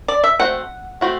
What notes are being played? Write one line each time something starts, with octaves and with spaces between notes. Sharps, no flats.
D5
E5
A3 C4 F#4 C5 E5 F#5
A3 C4 F#4 C5 E5